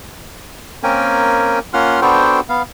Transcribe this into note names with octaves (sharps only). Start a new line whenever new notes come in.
A#3 C4 C#4 A#4 G5 G#5
A#3 C#4 F4 F#5 C6 F6
B3 D4 F#4 A4 C5 G5
B3 F5